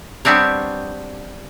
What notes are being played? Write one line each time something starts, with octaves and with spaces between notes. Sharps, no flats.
G3 B3 C4 D4 C#5